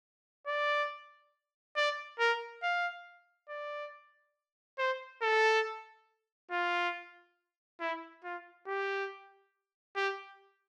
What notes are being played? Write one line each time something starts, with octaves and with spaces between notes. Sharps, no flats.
D5
D5
A#4
F5
D5
C5
A4
F4
E4
F4
G4
G4